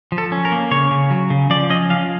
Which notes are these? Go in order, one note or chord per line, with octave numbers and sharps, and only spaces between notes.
F3
A4
C#4
A#4
A#3
C#3 C#5
C#3
F#3
C#3
F3 D5
C#4 D#5
F3 F5